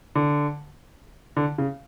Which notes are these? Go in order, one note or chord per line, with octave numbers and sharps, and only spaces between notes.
D3
D3
C#3